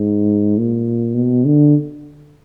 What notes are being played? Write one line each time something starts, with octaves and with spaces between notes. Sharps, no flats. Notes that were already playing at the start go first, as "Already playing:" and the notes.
Already playing: G#2
A#2
B2
D3